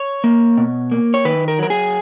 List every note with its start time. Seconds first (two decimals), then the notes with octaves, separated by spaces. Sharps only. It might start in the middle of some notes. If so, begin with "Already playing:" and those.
Already playing: C#5
0.24 A#3
0.58 B2
0.92 A#3
1.14 C#5
1.25 D#3 B4
1.48 A#4
1.59 F#3 A#4
1.70 G#4